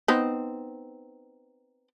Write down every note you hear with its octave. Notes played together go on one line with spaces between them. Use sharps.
B3 C4 D#4